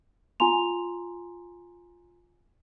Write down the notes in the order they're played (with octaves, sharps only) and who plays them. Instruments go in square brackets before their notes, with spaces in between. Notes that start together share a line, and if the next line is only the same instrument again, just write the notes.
[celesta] F4 G#5 A#5 C6 F7